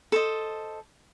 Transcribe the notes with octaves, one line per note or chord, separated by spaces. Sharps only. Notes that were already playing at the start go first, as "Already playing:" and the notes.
A4 C5 D#5